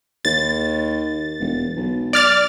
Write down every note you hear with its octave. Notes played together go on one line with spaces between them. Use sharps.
D#2 A6
E1
B1
D5 F6 A6